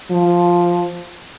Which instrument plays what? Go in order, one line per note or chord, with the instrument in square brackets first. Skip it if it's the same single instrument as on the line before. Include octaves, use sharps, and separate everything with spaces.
[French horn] F3